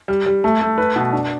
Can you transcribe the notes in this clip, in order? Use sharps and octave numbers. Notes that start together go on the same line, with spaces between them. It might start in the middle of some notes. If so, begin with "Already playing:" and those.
G3
G3
A3
A3
B4
B2
D4